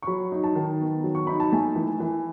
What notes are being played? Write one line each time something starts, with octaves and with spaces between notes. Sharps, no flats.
C#6
F#3 B5
D#4
A5
D#3
B3
F#3
C#6
D#4 B5
A5
A3 G#5
E3
E3